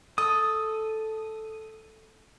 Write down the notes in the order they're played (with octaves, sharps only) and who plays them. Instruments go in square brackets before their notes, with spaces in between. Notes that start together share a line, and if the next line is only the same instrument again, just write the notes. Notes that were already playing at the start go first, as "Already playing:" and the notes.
[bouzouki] A4 [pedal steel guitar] D#6